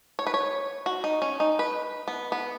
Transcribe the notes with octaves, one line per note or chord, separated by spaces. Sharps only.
C#5
B4
C#5
F#4
D#4
C#4
D#4
B4
B3
B3